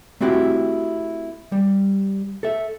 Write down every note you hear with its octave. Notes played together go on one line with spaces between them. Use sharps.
A3 C4 E4 F#4 G4
G3
A4 E5